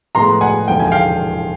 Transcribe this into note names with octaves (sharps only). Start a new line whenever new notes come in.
A2 F3 G#3 B3 A#5 C6
F#5 G#5
E1 D#2 D3 F3 G5
G#5
F5 G5